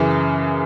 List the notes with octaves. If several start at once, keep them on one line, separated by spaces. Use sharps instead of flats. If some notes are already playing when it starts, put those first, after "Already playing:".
Already playing: F#2 C#3 E3